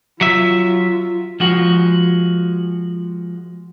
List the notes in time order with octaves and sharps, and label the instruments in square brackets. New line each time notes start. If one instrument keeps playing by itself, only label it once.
[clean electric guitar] F#3 E5 [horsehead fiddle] F4
[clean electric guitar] F3 G#3 F#4